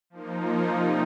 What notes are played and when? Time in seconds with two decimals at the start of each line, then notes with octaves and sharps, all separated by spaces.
0.10 F3 A#3 D#4
0.71 C3 G3 D#4